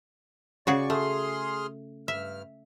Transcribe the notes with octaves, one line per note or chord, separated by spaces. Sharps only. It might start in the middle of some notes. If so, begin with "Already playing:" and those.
C#3 F#4 G#4 D5 C#6
A3 G#4 C6 F6
G2 E5 F6